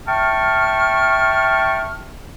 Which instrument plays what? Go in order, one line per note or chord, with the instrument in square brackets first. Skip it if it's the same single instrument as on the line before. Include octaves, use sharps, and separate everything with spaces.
[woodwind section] E5 G5 A5 C#6 F6